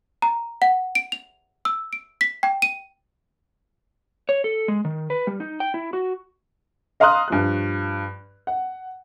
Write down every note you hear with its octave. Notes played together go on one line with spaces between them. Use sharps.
A#5
F#5
D7
F7
E6
D7
B6
G5
D#7
C#5
A4
G#3
D#3
B4
G3
D#4
G5
E4
F#4
D#5 F5 A#5 C6 D#6 F#6
G2 F3 F#6
F#5